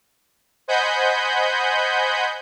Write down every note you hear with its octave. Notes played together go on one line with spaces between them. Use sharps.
C5 D#5 F#5 G#5 B5 G6